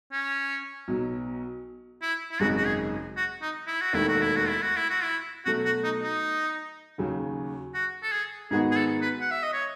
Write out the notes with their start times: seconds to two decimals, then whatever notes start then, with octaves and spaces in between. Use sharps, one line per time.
0.12 C#4
0.88 B1 B2 F#3
2.02 E4
2.31 E4
2.40 G#1 F#2 C#3 G#3 D#4 F#4
2.57 F#4
2.66 G#4
3.17 F#4
3.42 D#4
3.67 E4
3.81 F#4
3.93 E1 D#2 D#3 A3 E4
4.09 F#4
4.22 E4
4.36 F#4
4.48 E4
4.62 F#4
4.76 E4
4.90 F#4
5.03 E4
5.45 B2 F#3 A3 F#4
5.65 F#4
5.84 D#4
6.02 D#4
6.98 D#2 C#3 F#3
7.74 F#4
8.03 A4
8.12 G#4
8.51 G#2 D#3 G#3 B3 F#4 G#4
8.71 G#4
8.76 A4
9.02 B4
9.21 F#5
9.31 E5
9.43 D#5
9.53 C#5